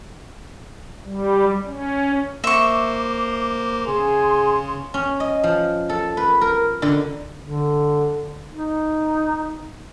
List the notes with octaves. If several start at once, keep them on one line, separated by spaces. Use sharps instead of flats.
G3
C#4
A#3 C5 E5 C#6 D6
C#3 G#4 C6
C#4
D#5
F3
A4
B4
A#4
D3
D3
D#4